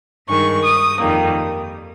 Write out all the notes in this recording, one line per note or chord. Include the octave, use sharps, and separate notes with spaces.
G2 D#3 G#3 C#6
D#6
F2 D#3 G3 A#3